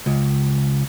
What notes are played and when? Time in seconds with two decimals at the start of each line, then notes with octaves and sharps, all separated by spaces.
0.06 C#2